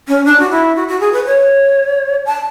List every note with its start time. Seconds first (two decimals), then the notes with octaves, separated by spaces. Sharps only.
0.08 C#4
0.25 D4
0.40 F#4
0.50 E4
0.76 F#4
0.88 F#4
1.00 G#4
1.13 B4
1.25 C#5
2.26 A5